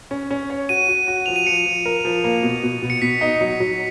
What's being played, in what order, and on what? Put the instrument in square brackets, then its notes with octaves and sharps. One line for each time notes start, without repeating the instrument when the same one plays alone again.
[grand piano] C#4
C#4
C#5
[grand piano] F#4 [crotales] D#7
[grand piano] F#4
F#4
[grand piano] F3 [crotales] F7
[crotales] D#7
[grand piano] F3 [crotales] C#7
[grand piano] F3
A#4
F3
A#3
B2
B2
B2
[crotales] C#7
[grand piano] B2 [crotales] B6
[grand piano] D#4
F#3
F#3